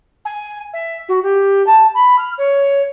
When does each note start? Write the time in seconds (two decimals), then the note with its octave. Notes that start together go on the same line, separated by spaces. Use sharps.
0.25 G#5
0.73 E5
1.08 F#4
1.23 G4
1.66 A5
1.94 B5
2.18 F6
2.38 C#5